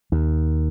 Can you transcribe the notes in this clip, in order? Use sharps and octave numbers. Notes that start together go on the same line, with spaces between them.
D#2